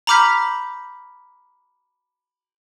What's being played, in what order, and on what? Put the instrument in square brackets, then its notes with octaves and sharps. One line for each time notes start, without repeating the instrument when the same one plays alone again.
[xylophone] A#5 B5 D6 F6 G6 B6